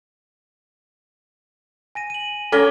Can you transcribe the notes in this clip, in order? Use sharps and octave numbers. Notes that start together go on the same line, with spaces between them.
G#5 A#6 D#7
D#7 F#7
C#4 A4 A#4 D6 G7